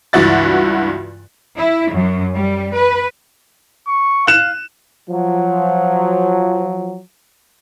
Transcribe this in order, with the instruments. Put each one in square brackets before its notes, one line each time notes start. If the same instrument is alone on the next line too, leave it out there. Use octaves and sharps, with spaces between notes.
[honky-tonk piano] C#2 G2 E3 F#4 E5 A6
[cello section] E4
F#2
G3
B4
[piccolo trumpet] C#6
[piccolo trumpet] F5 [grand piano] F#6 E7
[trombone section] F3 F#3